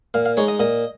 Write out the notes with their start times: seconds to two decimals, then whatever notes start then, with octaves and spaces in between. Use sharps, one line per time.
0.14 A#2 F5
0.25 F5
0.37 G#3 D#4 C#5
0.48 D#5
0.60 A#2 D#5